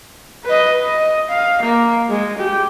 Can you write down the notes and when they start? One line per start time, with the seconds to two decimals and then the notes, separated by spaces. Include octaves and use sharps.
0.44 B4 D#5
0.82 D#5
1.29 F5
1.62 A#3
2.09 G#3
2.38 G4